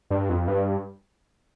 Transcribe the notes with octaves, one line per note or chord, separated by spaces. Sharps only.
G2
F2
G2